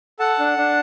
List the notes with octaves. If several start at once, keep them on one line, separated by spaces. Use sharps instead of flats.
A4 F#5 A5
D4
D4